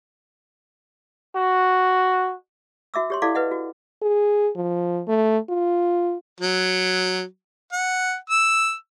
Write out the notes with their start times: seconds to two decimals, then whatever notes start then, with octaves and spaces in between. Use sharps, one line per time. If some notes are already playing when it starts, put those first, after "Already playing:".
1.36 F#4
2.94 F#4 E5 D6 E6
3.10 G4 C#5 C6
3.22 E4 A4 D5 F5 D6
3.35 B4 D#5 F#5
3.51 F#4
4.02 G#4
4.56 F3
5.08 A3
5.50 F4
6.40 F#3
7.72 F#5
8.30 E6